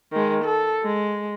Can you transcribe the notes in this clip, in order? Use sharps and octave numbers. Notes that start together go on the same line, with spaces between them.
D#3 G#3
A4
G#3